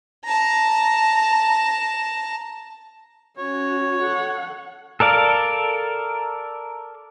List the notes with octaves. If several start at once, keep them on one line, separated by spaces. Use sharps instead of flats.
A5 A#5
C#4 F#4 C#5
A4 F#5
A4 A#4 D5 F5